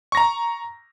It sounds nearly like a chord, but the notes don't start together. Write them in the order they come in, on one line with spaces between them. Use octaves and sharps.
C#6 A#6 A#5